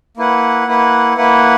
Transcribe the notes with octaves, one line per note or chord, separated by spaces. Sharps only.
A#3 E4 B4 F#5
A#3 E4 B4 F#5
A#3 E4 B4 F#5